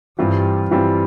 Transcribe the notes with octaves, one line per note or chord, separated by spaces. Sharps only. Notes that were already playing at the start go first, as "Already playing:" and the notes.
G2 E3 G3 C4 F4
G2 E3 G3 C4 F4